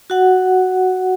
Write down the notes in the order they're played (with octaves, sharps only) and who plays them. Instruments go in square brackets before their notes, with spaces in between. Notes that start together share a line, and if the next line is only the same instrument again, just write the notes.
[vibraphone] F#4 F#5